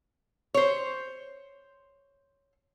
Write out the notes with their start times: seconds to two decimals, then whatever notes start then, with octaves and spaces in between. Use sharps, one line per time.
0.54 C5 C#5